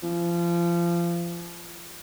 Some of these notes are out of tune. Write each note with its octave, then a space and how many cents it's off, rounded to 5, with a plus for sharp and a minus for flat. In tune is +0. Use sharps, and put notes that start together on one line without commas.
F3 -30